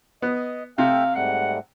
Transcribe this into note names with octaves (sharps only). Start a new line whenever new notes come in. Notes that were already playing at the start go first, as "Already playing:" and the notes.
B3 D#5
C3 A3 E5 F5 G5
G#2 G3 A3 F#5